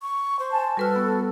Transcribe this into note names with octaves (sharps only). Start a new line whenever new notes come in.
C#6
C5
G#5 A5
G3 F#4 A4 B4 F6
B3